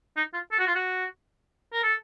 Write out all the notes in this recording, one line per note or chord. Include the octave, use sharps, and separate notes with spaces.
D#4
F4
A4
F#4
F4
F#4
A#4
A4